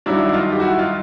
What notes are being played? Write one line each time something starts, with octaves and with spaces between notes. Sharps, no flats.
G2 D#3 F#3 D4 E4
D#4 F4
G4
E4 F#4
D#4 F4